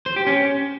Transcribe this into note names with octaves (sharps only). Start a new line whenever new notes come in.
C5
G4
C#4